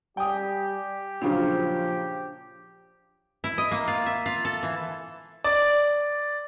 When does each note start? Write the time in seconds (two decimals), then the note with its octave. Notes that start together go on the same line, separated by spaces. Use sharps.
0.17 G3 G4 G5 G#5 D#6
1.22 A#2 C#3 F3 F#3 D4
3.44 E4
3.58 D#5
3.71 A#3
3.88 F4
4.06 E5
4.26 F4
4.45 A4
4.63 E3
5.44 D5